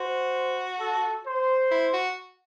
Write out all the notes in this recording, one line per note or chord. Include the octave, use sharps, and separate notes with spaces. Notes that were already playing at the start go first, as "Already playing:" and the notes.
Already playing: F#4 C5
A4
C5
E4
F#4